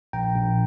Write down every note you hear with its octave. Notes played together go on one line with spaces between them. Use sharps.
A#1 G5 A#5
A#1